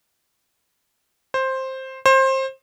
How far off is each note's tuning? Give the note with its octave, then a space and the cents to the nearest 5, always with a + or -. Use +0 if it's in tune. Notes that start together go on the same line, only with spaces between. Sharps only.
C5 +10
C5 +25